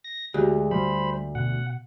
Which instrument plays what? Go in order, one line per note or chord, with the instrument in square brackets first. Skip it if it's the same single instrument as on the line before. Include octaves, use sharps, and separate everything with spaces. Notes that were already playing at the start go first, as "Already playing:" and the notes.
[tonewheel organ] A#6
[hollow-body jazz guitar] D2 [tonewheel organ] G#3 [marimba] F#4 G4
[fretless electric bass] G3 [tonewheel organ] C5 B5
[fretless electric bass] B2 [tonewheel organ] F#5